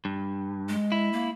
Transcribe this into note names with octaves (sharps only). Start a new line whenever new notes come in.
G2
G#3
E4
A#3